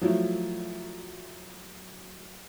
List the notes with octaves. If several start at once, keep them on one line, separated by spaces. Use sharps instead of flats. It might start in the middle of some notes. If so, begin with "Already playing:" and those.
F3 F#3 A3 E4